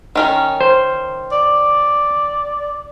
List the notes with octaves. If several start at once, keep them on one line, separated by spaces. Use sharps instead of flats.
D#3 C#4 A#4
C5
D5